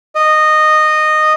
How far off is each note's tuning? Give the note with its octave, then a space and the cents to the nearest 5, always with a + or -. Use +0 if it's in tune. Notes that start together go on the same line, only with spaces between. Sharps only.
D#5 -15